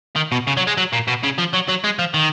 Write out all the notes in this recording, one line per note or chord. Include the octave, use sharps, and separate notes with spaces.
D#3
B2
C#3
F#3
G#3
F#3
A#2
B2
C#3
F3
F#3
F#3
G#3
F3
D#3